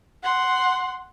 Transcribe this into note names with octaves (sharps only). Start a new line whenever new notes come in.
F#5 C6